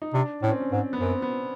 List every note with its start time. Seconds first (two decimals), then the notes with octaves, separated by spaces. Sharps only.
0.02 D#4
0.14 C3 D4
0.43 A2 C#4
0.52 C4
0.60 C#4
0.72 G#2 C4
0.93 B3
1.00 F#2 C4
1.22 B3